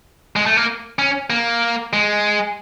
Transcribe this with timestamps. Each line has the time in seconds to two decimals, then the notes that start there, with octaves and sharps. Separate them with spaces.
0.36 G#3
0.46 A3
0.57 A#3
0.99 C#4
1.30 A#3
1.93 G#3